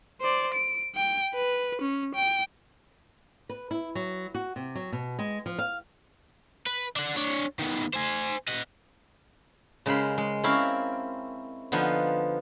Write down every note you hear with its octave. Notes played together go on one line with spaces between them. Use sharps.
C5 D5
D7
G5
B4
C#4
G5
B4
E4
F#3
F#4
C3
F#3
B2
G#3
F3
F5
B4
D4 F#5
D4 C#5
D#3 B3
C5 G#5
D#5 F#5
C#3 G#3 A#4 C5 B5
G#3
C4 C#4 E4 A#4 F5
D3 F3 B3 D#4 F4 G#5